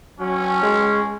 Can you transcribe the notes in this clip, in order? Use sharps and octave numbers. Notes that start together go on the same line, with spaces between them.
F#3 C#4
G#3